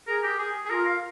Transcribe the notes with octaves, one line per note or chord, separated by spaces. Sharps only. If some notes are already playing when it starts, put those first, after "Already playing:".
G#4 A#4
G4
G#4
G#4
F4 A#4
F5